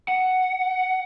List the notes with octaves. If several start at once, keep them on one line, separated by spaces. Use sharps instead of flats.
F#5